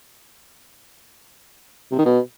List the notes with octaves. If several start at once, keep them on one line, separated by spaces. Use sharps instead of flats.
C3
D#3
B2